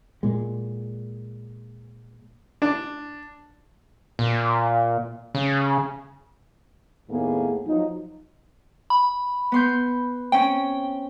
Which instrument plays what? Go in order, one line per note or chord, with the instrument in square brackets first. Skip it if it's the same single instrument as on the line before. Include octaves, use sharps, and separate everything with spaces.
[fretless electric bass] A#2 G#3
[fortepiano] D4
[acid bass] A#2
C#3
[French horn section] D#2 A2 A#3 B3 G#4
F3 F#3 D#4
[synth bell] B5
[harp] B3 C6 G6
[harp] C4 C#4 [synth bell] G5